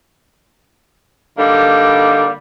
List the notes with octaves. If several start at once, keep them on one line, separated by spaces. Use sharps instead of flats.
D3 G3 A#3 D#4